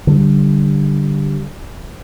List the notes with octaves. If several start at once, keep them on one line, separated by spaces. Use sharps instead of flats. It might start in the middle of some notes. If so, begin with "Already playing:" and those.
D3 G3